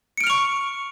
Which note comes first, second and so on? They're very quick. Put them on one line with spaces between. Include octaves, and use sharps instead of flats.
C#7 D7 F6 F7 C#6